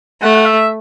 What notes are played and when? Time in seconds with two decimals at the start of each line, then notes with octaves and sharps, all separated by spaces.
0.22 A3 F#5
0.36 F#5
0.46 E5